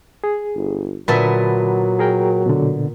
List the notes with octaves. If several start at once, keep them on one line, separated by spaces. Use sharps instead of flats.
G#4
G1
A#2 D3 F#3 B3 E5 A5 B5
G#4 A#4 G5
B2 D3